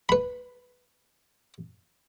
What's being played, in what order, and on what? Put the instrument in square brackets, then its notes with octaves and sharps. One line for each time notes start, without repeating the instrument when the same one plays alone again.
[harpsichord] B4 B5